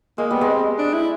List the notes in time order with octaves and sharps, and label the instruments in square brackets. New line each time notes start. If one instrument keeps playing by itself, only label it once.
[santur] G#3 [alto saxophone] A#3
[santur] G3 [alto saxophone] B3
[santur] G#3
[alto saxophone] C4
D4
E4